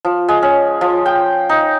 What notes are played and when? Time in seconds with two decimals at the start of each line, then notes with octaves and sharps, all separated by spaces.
0.05 F3
0.28 G#3
0.43 C#4
0.81 F3
1.06 G5
1.49 D#4